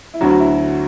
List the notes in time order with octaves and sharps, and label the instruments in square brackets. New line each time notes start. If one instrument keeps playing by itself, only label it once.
[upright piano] E4
D2 D3 F#3 F#4
F#4
E4